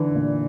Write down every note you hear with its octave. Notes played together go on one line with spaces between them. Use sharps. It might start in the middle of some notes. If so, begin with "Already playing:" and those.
Already playing: D3 E3
A#2